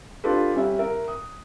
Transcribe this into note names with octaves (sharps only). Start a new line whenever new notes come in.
D4 F4 G4 A4 B4
G3 C#4 E5
A#4 E5
D#6